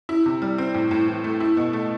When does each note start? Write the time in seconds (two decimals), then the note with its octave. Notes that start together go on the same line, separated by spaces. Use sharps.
0.09 E4
0.26 C3
0.42 G3
0.58 C4
0.74 A2
0.91 A2
1.08 E3
1.24 A3
1.40 E4
1.57 B2
1.73 A3